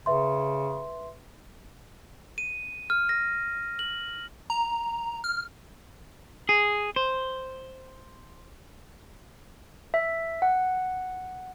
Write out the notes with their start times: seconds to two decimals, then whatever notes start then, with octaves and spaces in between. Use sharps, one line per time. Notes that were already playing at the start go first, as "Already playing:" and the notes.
0.06 C#3 B4 E5 C6
2.38 D#7
2.90 F6
3.09 A#6
3.79 F#7
4.50 A#5
5.24 F6
6.49 G#4
6.96 C5
9.94 E5
10.42 F#5